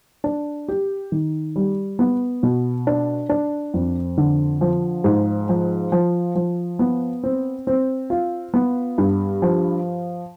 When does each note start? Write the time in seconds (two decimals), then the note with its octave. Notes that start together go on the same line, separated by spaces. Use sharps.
0.24 D4
0.69 G4
1.12 D#3
1.56 G3
1.99 B3
2.43 B2
2.87 D4
3.29 D4
3.74 F2
4.17 D3
4.61 F3
5.04 G#2
5.49 F3
5.92 F3
6.35 F3
6.79 B3
7.23 C4
7.67 C4
8.10 F4
8.54 B3
8.98 G2
9.42 F3